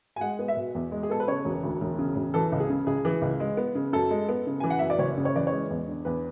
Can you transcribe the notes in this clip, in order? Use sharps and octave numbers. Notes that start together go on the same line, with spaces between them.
G#5
G#3 F#5
B3
E5
B2
E2
G#3
G#4
B3 A4
B4
C#3 C#5
E1
D2
E1
C#3
E1
E3 A4
C#2
G#4
C#3
C#2 G#4
E3
C#2
G#3
B3
C#3
F#2 A4
G#3
B3
C#3
E3 G#5
F#5
F#2 E5
D5
F#1 C#5
C#3
C#5
E3 D5
C#5
G#3
E2
D3
E2 B4